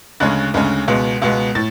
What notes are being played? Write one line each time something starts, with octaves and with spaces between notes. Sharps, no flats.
D2 C#3 G#3 C#4 F#6 A6
D2 C#3 G#3 C#4
C#2 B2 G#3 B3
C#2 B2 G#3 B3
A2 A6